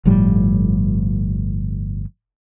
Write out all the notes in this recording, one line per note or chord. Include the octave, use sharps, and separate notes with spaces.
G1 A2 F3 G3